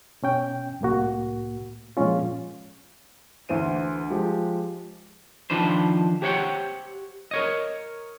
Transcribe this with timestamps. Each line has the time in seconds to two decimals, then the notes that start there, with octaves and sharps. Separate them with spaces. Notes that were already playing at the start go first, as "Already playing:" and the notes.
0.22 B2 C#4 G5
0.81 C2 A2 A#3 F#4
1.97 A#2 F3 G#3 C#4 F4
3.49 D2 E3 C5 D#7
4.10 F3 G#3 G4
5.50 D#3 F3 D4 B4 C5
6.22 G4 C5 C#5 E5 F#5 G5
7.31 A#4 C#5 D#5